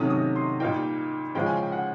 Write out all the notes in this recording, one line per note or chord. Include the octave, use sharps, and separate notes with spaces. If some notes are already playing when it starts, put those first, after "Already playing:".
Already playing: C3 D#3 F#3 A3 C#4 D#6
D#6
C6
A#2 G3 A#3 D#4 G5
C#3 F3 G#3 C#4 G5
G#5
G5
F#5